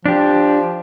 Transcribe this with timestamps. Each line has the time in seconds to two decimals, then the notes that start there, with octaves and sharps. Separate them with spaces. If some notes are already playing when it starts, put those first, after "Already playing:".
0.06 F3 D4 G4